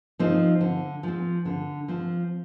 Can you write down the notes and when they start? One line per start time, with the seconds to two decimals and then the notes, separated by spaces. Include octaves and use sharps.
0.19 F3 C4 D#4
0.61 D3
1.03 F3 C4
1.45 D3
1.88 F3 C4